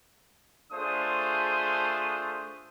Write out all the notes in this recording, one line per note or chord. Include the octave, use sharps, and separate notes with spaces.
A3 D4 F4 G#4 C5 D#6